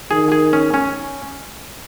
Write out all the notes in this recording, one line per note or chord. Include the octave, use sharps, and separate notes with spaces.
D#3 G#4
G#4
C#4
C#4